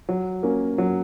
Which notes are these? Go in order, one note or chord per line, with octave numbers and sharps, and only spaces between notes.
F#3
A#3 C#4
F#3